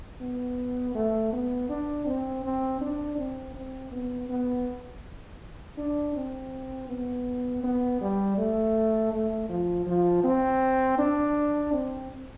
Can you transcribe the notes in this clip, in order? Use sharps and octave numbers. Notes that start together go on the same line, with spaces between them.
B3
A3
B3
D4
C4
C4
D4
C4
C4
B3
B3
D4
C4
B3
B3
G3
A3
A3
F3
F3
C4
D4
C4